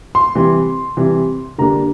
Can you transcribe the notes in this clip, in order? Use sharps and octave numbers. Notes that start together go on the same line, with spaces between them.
C6
C3 E3 G3
C3 E3 G3
D3 G3 A#3 D4 A#5